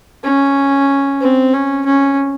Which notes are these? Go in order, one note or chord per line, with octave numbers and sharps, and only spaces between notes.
C#4
C4
C#4
C#4